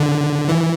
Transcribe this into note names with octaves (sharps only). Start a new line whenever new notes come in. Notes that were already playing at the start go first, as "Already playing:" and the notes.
Already playing: D3
E3